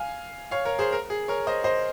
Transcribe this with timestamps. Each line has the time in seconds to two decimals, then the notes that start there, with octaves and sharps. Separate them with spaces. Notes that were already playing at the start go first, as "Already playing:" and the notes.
Already playing: F5 G#5
0.51 C#5 F5
0.65 A#4 C#5
0.79 G#4 C5
0.92 A#4
1.10 G#4
1.28 A#4 C#5
1.47 C5 D#5
1.64 C5 D#5